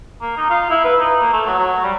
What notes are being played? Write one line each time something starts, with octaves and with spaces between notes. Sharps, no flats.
A#3
D#4
F4
E4
B4
D#4
A#3
A3
F#3
F#3
G3